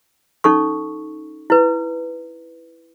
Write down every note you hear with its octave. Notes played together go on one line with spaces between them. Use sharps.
C#4 D#4 A4 C#6
E4 B4